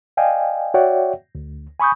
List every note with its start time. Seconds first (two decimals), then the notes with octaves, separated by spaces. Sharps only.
0.17 D5 D#5 F5 G5 G#5
0.74 F#4 C#5 D5 E5 F#5 G5
1.35 D2
1.80 G#5 B5 C#6 D#6 G6